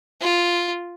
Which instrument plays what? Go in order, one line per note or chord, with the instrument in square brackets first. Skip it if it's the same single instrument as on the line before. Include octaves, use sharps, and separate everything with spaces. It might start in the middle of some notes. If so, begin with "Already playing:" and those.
[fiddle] F4